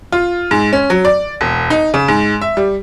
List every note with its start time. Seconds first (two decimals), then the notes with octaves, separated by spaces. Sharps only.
0.12 F4
0.51 G#2
0.73 C#4
0.90 F#3
1.05 D5
1.41 E1
1.70 D#4
1.94 C#3
2.08 G#2
2.41 E5
2.57 G3